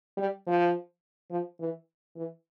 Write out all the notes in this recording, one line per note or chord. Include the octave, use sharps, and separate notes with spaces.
G3
F3
F3
E3
E3